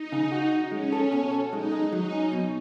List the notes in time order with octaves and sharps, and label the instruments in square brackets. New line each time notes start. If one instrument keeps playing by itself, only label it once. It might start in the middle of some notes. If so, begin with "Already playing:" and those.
Already playing: [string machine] D#4
[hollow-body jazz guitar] C#3
F#4
D#4
[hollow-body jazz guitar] G#3 [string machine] C#4
[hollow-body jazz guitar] A4
B2
A4
[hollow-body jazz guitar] G#3 [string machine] D#4
[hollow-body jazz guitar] G#3
[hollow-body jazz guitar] F#3 [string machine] D#4
[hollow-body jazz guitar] C#4
B2